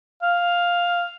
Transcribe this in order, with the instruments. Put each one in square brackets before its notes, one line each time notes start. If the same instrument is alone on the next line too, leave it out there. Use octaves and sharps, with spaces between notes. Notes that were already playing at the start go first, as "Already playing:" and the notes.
[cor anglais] F5